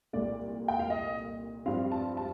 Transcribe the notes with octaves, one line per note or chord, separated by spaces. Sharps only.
C2 A#2 A3 D5
G5
F5
D#5
G2 F3 C4 F5
A5
A5